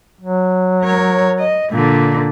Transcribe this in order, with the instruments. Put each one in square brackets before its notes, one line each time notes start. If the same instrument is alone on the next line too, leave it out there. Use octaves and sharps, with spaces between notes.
[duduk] F#3
[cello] A#4 C#5
D#5
A#2 D3